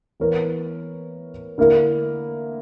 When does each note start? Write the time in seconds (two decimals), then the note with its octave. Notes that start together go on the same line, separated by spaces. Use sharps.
0.20 E3 B3 E4 A#4 C#5
1.58 D3 A#3 E4 A#4